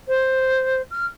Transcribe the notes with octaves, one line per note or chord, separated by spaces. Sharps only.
C5
F6